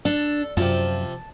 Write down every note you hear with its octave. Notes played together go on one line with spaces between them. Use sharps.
D4 A4
F#2 C3 F3 A5